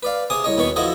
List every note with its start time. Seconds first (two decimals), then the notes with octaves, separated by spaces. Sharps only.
0.03 B4 D5 F5
0.30 C3 G#4 D6 D#6
0.44 C2 C#5 D#5
0.57 D#2 B2 D#3 B4 C#5 C#6
0.76 F3 E4 F#4 A4 D#5